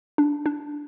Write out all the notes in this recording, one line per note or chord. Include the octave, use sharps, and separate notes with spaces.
D4
D4